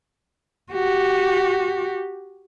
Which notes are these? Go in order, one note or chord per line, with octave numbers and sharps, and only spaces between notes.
F#4 G4